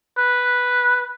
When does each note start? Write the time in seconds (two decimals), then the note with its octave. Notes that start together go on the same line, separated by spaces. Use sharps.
0.18 B4